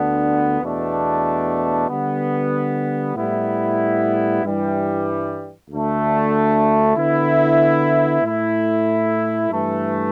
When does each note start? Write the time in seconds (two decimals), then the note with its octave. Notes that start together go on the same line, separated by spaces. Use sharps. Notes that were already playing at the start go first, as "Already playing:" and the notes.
Already playing: D2 D3 B3 D4
0.61 E2 B2 A3 D4
1.88 D3 G3 B3
3.15 A2 G3 B3 E4
4.42 G2 E3 G3 E4
5.69 D2 D3 A3 D4
6.95 D3 B3 E4
8.23 A2 A3 E4
9.49 G2 E3 A3